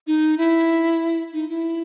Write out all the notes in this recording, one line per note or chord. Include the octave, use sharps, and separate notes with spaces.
D#4
E4
D#4
E4